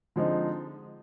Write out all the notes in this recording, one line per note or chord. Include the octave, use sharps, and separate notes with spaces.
D3 F3 G#3 C4 D#4